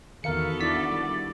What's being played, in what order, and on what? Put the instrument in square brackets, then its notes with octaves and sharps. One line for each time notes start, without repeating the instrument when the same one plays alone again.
[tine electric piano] E2 A#4 C#7 [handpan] D#3 F5 [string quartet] B3 F#4 A4
[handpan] D4 E4 [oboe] D5 [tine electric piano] B6
[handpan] G3